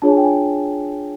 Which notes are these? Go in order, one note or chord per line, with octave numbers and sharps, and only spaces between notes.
D4 F4 G#4 C#5 A5
G#5
G5
G#5